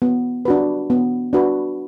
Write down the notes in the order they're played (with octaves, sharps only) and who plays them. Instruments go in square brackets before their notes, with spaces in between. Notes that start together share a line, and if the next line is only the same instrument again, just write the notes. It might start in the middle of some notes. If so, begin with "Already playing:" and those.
[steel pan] B3
D4 F#4 B4
B3
D4 F#4 B4